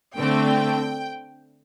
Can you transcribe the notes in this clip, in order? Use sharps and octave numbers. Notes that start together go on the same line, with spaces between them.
D3 A3 C4 G5